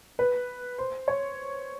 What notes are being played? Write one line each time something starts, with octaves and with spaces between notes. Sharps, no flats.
B4
C5
C#5